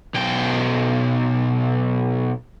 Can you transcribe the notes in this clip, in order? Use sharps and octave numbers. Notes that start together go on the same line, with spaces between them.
B1 G5